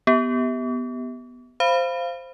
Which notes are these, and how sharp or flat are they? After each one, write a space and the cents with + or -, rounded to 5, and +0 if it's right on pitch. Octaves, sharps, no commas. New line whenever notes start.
B3 +0 G4 +0
C5 +0 F5 -15 B5 +0